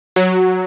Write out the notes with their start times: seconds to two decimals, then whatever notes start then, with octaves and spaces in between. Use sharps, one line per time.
0.16 F#3